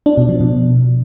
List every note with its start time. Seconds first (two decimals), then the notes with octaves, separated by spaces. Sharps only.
0.06 D4
0.17 B2
0.29 F3
0.40 B2